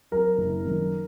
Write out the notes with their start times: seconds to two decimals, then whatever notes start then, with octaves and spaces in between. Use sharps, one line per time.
0.11 F#3 C4 A#4
0.38 F#1
0.64 F#2 D#3